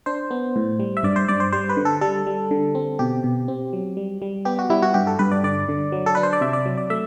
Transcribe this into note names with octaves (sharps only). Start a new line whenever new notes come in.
D4 C5
B3
A2
G3
E5
G2 D5
C5
G2 D5
C5
G3 C5
B4
D3
A4
G3 A4
G3
D3
C4
B2 G4
B2
C4
F#3
G3
G3
B3 G4
F#4
G3 E4
F#4
G2 G4
A4
G2 B4
D5
D3 D5
D3
F#3
A4
D4 B4
C5
D5
C3 E5
D5
F#3
D5
A3 E5